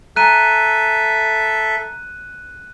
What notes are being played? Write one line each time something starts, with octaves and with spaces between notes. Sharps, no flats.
A4 E5 G#5 A#5 F#6 D#7